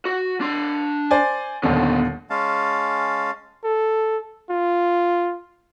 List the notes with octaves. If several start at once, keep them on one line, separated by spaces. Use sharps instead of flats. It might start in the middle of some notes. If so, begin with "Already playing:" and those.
F#4
D4 C6
C5 D5 G#5
D#1 D#2 D3 B3 C#4
G#3 C#4 F5 A5
A4
F4